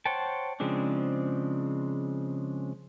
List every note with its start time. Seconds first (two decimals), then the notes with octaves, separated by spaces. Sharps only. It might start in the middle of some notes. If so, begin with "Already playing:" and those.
0.05 C5 C#5 F#5 G5 A5
0.60 C#3 F3 G#3 C4 D4